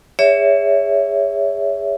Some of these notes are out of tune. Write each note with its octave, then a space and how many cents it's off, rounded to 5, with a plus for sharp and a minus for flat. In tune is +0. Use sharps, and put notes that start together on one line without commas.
G#4 -25 C#5 +20 E5 +0